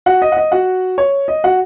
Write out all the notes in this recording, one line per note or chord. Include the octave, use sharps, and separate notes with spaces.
F#4 F#5
D#5
F#5
D#5
F#4 F#5
C#5
D#5
F#4 F#5